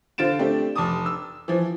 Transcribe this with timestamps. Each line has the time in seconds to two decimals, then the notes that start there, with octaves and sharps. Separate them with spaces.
0.18 D3 F4 C5 A6 D7 E7
0.39 A3 C4 D4 G4
0.76 F1 A5 D6 D#6
1.06 E6
1.48 E3 F3